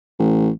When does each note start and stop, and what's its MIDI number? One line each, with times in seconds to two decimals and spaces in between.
0.19 0.50 33